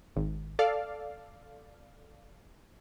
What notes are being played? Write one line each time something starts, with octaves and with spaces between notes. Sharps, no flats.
G#1
A4 D5 F5